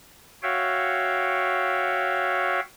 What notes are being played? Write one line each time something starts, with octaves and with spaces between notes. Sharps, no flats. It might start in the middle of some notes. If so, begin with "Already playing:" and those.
F#4 C#5 E5 F5 G5